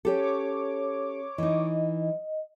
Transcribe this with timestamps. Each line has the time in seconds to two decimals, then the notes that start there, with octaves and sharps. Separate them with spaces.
0.05 C#4 G4 A4 C#5 D6
1.38 E3 D#4 D#5